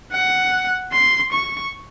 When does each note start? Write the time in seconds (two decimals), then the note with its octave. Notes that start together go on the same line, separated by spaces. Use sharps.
0.12 F#5
0.92 C6
1.33 C#6